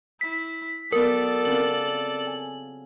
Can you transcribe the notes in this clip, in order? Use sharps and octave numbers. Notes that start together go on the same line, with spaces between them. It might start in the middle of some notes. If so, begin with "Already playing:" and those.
E4 B6
F#3 B3 A4 A#4 D5
C#3 C4 F4 F#7
G#5